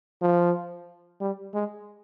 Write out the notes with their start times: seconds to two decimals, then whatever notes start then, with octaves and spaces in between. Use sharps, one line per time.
0.22 F3
1.21 G3
1.54 G#3